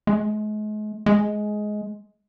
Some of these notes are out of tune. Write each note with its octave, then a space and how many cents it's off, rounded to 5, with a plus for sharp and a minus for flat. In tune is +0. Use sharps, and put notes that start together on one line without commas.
G#3 +40
G#3 +15